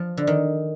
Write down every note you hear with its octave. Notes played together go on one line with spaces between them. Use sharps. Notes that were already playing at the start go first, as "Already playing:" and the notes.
Already playing: F3
D3
D#3